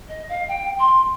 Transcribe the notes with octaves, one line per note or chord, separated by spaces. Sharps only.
D#5
F5
G5
C6